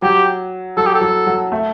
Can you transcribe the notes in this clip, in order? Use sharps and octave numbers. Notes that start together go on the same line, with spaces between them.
F#3 G4
F#3 A4
G4
A4
F#3
F#3
A3